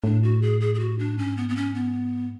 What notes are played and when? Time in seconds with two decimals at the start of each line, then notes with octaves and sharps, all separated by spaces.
0.04 A2 D4
0.23 F#4
0.42 G#4
0.61 G#4
0.75 G#4
0.80 F#4
0.99 D4
1.17 G#2 C#4
1.37 B3
1.49 B3
1.56 C#4
1.75 B3